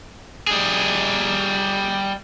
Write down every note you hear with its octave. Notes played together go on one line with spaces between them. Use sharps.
G3 G#4